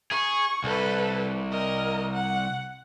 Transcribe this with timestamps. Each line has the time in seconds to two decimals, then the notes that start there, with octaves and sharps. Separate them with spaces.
0.11 G#4 C#6
0.64 C2 A4 B4
1.52 A#4 D#5
2.14 F#5